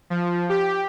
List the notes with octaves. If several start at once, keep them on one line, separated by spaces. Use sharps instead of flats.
F3
G4